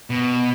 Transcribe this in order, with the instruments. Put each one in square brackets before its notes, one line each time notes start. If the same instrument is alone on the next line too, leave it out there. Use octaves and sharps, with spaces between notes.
[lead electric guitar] B2